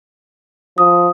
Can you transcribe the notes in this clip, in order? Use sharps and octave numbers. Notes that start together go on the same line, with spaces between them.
F3 D#6